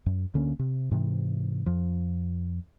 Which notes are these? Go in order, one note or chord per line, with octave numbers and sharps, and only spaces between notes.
F#2
D2 D3 A#3 C#4
C3
G#2 C3 E3
F2 F3